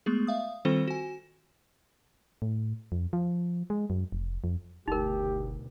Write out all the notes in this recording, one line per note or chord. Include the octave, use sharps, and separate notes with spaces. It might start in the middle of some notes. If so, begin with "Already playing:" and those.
G#3 A3 B3 G#4
E5 F5 D#6
D#3 G3 C4 F4 A4 C5
F#4 G#5
A2
F2
F3
G#3
F#2
F1
F2
F#1 D2 B2 D#4 G4 A#4